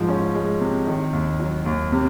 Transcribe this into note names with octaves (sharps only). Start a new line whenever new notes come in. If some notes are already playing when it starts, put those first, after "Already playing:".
Already playing: G#2 F3
C#4
G#3
C3
D#3
D#2
F#3
D#2
C3